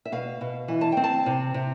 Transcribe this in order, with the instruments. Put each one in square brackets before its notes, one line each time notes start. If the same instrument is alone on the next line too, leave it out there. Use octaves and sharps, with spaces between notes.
[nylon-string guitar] E5
B2 F5
B2
E3
A5
C4 G5
A5
C3
C3